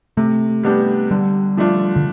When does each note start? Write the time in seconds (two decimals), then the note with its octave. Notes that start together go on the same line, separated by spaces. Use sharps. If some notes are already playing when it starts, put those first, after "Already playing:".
0.17 C3 A3
0.63 G3 B3 D4 G4
1.11 D3 G3
1.57 F3 A3 D4 F4
1.96 D3